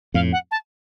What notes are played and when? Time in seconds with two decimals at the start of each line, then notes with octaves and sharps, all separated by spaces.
0.14 F2 A2 F5
0.32 F#5
0.51 A5